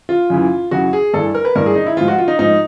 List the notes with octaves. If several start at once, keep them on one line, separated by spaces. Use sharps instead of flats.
F4
F#2 C#3 E3
F#2 C#3 E3 F#4
G#4
G2 E3 A4
A#4
B4
G2 E3 A#4
G#4
D#4
E4
G#2 F3 F4
F#4
F4
D#4
G#2 F3 D#4